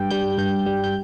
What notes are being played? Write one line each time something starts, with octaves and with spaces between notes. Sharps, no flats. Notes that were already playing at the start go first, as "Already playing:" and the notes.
Already playing: G2 G5
G3 G6
G2 G6
G3
G6